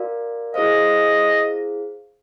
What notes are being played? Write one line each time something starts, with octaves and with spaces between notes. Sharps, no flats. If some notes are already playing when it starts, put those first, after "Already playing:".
Already playing: F#4 A#4 D5 F5
E4 G#4 C5 D#5 F5